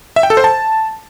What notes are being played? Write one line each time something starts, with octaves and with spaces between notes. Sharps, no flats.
E5
G5
A4
C5
A5